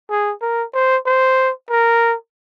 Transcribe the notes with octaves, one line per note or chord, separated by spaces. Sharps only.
G#4
A#4
C5
C5
A#4